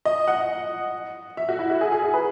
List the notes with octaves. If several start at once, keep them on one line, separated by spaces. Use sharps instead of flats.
D#5
F#5
E5
F#4
E4
F#4
G#4
G#4
G#4
B4